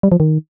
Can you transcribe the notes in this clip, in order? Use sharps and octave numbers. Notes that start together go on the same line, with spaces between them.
G3
F3
D#3